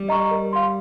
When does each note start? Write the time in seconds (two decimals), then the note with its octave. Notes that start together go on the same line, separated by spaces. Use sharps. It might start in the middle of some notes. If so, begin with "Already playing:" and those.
Already playing: G3
0.09 D#5 A#5 C#6
0.31 A#4
0.53 F5 C6